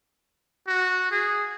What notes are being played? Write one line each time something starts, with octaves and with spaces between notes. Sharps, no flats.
F#4
G#4